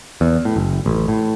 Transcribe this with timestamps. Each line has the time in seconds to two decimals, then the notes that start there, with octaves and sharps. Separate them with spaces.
0.21 E2
0.45 A2
0.56 F#1
0.86 A1
1.08 A2